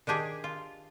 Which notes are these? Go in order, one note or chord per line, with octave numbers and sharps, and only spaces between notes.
D#3 D4 G4 G#4
F4